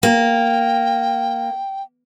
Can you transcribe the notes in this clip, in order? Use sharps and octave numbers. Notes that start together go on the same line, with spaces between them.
A#3 G5